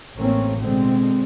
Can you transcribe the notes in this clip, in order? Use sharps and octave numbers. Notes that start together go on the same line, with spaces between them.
A1 A3 A#3 C4 C#4
B2 D3 G#3 C4